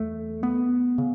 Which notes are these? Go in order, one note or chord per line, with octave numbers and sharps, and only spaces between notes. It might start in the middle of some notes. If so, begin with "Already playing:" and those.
Already playing: E2 A3
B3
C#3